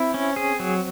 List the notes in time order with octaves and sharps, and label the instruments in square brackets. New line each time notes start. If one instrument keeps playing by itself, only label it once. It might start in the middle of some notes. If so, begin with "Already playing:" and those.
Already playing: [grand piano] C4 [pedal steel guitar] E4
[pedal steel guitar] C#4
G#4
F#3